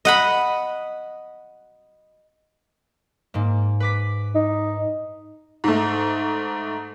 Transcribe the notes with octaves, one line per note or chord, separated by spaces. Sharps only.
D#5 F#5 B5
G#2 A#3
B4 D6 B6
D#4
G#2 A3